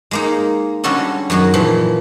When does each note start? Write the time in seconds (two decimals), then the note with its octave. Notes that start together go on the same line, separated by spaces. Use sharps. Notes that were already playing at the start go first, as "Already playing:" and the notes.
0.11 G#3 A#3 D#4
0.84 D3 G3 C#4 F#4 A4 D#5
1.30 F#2 D#3 F#4 G#4
1.54 A#2 E3 F3